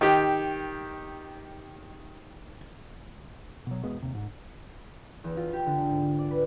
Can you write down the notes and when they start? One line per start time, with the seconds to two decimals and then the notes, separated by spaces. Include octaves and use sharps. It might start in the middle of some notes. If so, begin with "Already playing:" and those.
0.01 D#3 G4
3.67 B2 F#3
3.83 E1 G#3 B3
4.02 D#2 C3
4.15 G#2
5.24 E2
5.37 F4
5.53 G4
5.66 D3
5.89 G#2
6.19 D5
6.31 B4